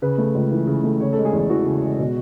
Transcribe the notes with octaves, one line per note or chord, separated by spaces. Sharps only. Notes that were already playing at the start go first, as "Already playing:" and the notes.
C#3 B4
A3
C#2
E3
C#3
A3
C#3 C#5
A4
G#3
G#4
E2
G#4
E3 F#4
C#3
G#3
B2